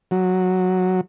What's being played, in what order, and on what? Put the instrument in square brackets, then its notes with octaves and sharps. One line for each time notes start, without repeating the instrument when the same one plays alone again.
[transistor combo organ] F#3